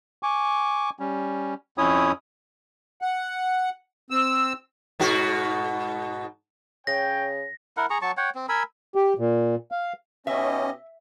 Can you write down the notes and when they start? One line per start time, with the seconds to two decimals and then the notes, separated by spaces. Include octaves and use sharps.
0.23 G#5 C#6 D6
0.99 G3 C#4
1.78 F2 C#4 E4 C#5 D#6
3.02 F#5
4.11 C4 E6
5.00 G#2 B2 F#4
6.87 C#3 C#5 G5 A#6
7.77 E4 A#4 F#5
7.90 G#4 A#5 C#6
8.02 F#3 A5 C#6
8.17 C#5 F#5 G5
8.35 C4
8.49 A#4 G#5 B5 E6
8.95 G4
9.18 A#2
9.72 F5
10.27 B2 C#4 D#4 G4 D#5 E5